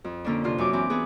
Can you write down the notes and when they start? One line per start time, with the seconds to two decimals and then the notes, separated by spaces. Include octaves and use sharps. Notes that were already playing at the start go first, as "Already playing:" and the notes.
0.04 F2
0.24 D3 A#3 C#4 D4
0.44 C3 D4 F4
0.58 F#2 G#5 D6
0.73 E3 C4 D6
0.90 E3 B3 G#4 B4